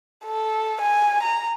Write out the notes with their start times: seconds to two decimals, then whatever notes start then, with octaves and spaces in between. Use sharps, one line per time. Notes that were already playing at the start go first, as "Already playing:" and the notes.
0.25 A4
0.82 G#5
1.23 A#5